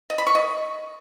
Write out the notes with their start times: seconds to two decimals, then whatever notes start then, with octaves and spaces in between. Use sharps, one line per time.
0.10 D#5
0.18 B5
0.27 C#6
0.35 D#5